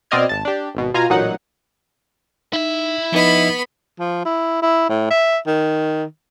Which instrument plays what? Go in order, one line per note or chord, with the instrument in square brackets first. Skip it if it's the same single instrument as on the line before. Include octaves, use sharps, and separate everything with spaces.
[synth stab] B2 C4 D5 D#5 F6 G#6
G#1 A5
D4 G4
G#1 B2
B2 F4 G#5 A#5
A1 A#2 F#3 D#4 F#5
[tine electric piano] D#4 [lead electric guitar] E4 E5
[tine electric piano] F3 D#4 D#5 [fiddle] B3 B5
[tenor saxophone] F3
E4
E4
A2
E5
D#3